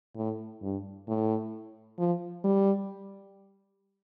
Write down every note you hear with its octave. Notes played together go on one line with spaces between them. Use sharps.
A2
G2
A2
F3
G3